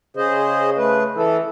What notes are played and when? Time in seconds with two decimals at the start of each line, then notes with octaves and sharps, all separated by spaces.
0.17 C#3 G#4 C5 D#5
0.77 A3 B4
1.16 E3 A4